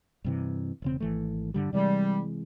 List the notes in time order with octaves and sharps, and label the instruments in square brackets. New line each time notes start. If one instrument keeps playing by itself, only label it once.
[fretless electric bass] G2 C3 E3
E1 C#3 C4
G#1 E3 A3
G2 D3 G3
[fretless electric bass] C3 E3 G#3 [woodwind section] G3